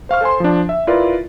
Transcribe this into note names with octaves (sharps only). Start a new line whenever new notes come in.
C5 F5 C#6 F6
A4 C5 G#5 C6
F3 D4
E5
E4 F4 A#4 B4 D5